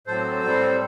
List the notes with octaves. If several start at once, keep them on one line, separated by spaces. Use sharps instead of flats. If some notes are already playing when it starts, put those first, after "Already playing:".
A2 F#3 C4 A4 C5
A2 G3 C4